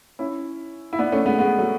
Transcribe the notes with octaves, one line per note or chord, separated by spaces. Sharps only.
C#4 E4
E4
B3 D4
A3 C#4
G#3 B3
G#3 B3
F#3 A3